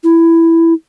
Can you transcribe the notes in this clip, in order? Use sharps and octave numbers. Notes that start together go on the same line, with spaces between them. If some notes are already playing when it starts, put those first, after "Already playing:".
E4